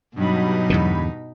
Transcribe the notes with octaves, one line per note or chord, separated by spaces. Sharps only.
G2 B2 F#3 D#4 B5
E2 G#2 D3